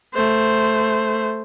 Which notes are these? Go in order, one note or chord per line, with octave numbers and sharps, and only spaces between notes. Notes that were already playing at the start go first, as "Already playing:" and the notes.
A3 C5